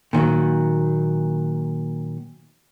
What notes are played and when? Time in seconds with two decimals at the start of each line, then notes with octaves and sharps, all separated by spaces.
0.13 A#2 D#3 F3 F#3